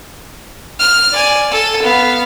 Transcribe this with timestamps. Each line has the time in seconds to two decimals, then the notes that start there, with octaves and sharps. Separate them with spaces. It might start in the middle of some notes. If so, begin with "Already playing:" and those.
0.79 F6
1.12 D5 G#5
1.51 A4
1.82 B3 F5